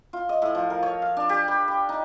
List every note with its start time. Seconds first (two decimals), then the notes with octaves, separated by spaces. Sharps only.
0.13 F4
0.29 D#5
0.42 A2
0.55 F3
0.70 A#4
0.83 C#5
1.02 F5
1.17 D4
1.29 G4
1.48 B5
1.68 B5
1.89 D#4